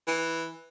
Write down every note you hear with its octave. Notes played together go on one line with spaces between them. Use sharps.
E3